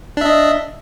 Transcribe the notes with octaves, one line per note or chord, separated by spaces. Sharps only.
D4 D#5 E5